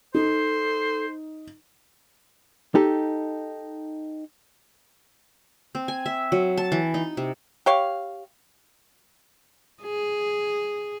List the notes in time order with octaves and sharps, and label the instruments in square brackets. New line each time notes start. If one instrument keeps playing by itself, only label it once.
[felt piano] D#4 [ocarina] A4 [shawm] C5
[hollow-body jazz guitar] D#4 G4 A4
[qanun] C4
G#5
E5
F#3
A5
E3
D#4
C3
[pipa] G4 C#5 F5
[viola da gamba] G#4